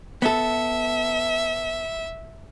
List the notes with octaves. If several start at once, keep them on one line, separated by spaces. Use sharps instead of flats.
B3 A4 E5